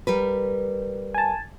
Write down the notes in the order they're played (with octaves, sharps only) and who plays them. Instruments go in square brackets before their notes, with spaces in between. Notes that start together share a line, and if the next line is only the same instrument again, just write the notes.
[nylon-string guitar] G3 A#4 B4
[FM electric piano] G#5 A5